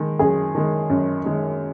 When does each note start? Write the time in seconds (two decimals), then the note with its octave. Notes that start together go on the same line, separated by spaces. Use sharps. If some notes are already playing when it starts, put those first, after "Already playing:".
Already playing: D#3 G#3
0.19 F#2 G#4
0.55 D#3 G#3
0.90 F#2
1.25 D#3 G#3